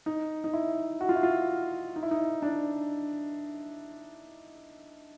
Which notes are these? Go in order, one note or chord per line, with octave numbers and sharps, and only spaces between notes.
D#4
D#4
E4
F#4
F4
E4
F4
D#4
E4
D#4
D4